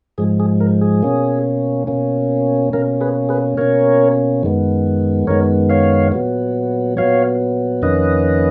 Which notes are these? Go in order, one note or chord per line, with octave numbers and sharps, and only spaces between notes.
G#2 F3 G#3 G#4
G#4
A#4
G#4
B2 A#3 C#4
B2 A#3 C#4
B2 A#3 C#4 A#4
G#4 B4
G#4 B4
B2 A#3 C#4 A#4 C#5
F#2 D#3 G#3 B3
F#2 D#3 G#3 B3 A#4 C#5
C#5 F5
A#2 F#3 B3
A#2 F#3 B3 C#5 F5
F2 D#3 A#3 C#4 B4 D#5